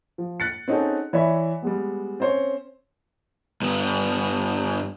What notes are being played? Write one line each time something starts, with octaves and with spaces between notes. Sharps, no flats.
F3
F#6 A6 C#7
C4 C#4 D#4 F#4 G#4 A4
E3 C#5 D5 E5 B5
G3 G#3 B3
C4 C#4 C5 C#5
G2 B3